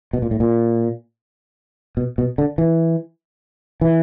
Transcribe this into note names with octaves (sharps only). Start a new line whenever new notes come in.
B2
A#2
A2
A#2
B2
B2
D3
E3
E3